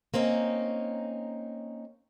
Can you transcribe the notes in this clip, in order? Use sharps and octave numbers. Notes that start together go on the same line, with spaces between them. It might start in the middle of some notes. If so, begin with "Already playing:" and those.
A#3 C4 C#4 D#4